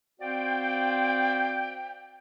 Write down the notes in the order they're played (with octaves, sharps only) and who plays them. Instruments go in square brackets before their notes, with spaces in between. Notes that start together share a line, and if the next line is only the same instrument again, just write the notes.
[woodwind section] C4 F#4 C5 D5 F5 G5